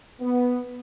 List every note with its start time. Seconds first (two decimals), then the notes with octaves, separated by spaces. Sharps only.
0.21 B3